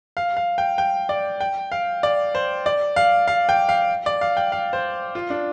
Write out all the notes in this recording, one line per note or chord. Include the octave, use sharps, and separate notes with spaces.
F5
F5
G5
G5
D5
G5
F5
D5
C5
D5
F5
F5
G5
F5
D5
F5
G5
F5
C5
F4
D4